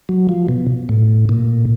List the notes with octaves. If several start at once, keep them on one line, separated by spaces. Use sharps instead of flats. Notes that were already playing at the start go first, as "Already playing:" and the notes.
F#3
F3
B2
A2
A#2